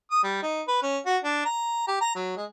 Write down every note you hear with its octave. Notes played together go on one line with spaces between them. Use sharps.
D#6
G3
D#4
B4
C#4
F#4
D4
A#5
G4
A#5
F#3
G#3